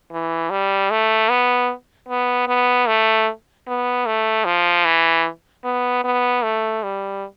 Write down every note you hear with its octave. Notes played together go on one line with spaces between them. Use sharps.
E3
G3
A3
B3
B3
B3
A3
B3
A3
F3
E3
B3
B3
A3
G3